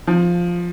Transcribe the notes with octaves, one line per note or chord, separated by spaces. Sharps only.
F3